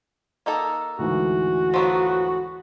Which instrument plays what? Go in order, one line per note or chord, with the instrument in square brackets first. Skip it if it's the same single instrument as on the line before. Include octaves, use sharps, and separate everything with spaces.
[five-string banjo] A#3 D#4 A4
[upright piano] D2 G#2 E3 [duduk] F#4
[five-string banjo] F3 F#3 B3